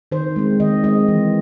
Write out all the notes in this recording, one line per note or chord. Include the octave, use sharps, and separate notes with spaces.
D#3 C5
G#3 C4
D#3 D#5
G#3 C4 D#5
E3